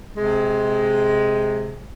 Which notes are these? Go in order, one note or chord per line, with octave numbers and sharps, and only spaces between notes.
C3 G#3